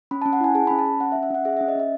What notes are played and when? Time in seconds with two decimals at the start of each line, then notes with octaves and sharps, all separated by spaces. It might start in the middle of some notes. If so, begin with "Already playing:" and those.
0.11 C#4 B5
0.22 C#4 A5
0.33 F#5
0.40 E4 G#5
0.55 G#4 A5
0.67 C#4 B5
0.78 A5
0.85 C#4
1.00 C#4 F#5
1.12 E5
1.15 C#4
1.23 E5
1.30 C#4 F#5
1.45 G#4 E5
1.57 C#4 E5
1.68 D#5
1.75 C#4 E5